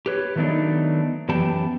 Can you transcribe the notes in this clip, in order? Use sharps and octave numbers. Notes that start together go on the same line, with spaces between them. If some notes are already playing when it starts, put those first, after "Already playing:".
G4 B4 C#5
D#3 F#3 A3 B3 D4 D#4
F#2 E3 B3 G4 G5 A5